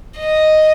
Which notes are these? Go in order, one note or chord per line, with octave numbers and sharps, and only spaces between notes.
D#5